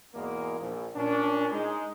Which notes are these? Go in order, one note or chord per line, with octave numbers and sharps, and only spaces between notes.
E2 G#2 B2 G#3 A#3
A#1
A#2 C#4 D4
G#3 D#4